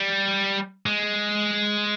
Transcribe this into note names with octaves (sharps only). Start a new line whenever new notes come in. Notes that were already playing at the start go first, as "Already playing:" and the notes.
Already playing: G3
G#3